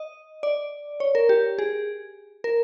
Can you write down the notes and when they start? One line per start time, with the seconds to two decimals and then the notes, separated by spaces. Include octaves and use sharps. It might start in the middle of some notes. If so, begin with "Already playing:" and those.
Already playing: D#5
0.43 D5
1.00 C#5
1.15 A#4
1.29 G4
1.59 G#4
2.44 A#4